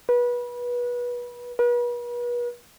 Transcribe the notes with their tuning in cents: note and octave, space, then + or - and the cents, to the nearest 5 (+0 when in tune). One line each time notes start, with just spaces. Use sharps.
B4 -25
B4 -40